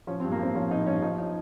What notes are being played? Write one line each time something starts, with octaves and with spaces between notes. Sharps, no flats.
F3 C#4
C4
G2
A#3
G2 C4
F3 C#4
F3 D#4
G2 C#4
F3 D#4
D#4